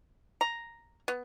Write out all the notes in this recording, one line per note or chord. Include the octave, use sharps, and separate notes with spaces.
A#5
B3